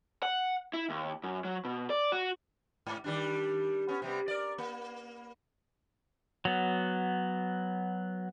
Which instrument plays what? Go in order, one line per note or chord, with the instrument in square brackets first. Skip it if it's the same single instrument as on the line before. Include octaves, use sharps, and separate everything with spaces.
[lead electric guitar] F#5
E4
D#2
F#2
F#3
B2
D5
F#4
[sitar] G#2
D#3 G3 D4
B3 C#4
C3 G3 B3
A#4 D5
A#3
[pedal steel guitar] F#3 B3